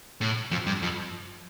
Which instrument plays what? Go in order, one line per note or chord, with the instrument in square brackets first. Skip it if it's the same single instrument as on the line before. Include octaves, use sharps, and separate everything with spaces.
[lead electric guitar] A2
F2
G2
F2